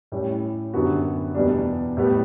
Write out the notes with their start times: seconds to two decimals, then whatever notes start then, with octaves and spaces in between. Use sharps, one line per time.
0.12 A2 G3 C#4 E4
0.74 F#2 D3 G3 B3 F#4
1.35 E2 B2 G3 D4
1.97 A2 G3 B3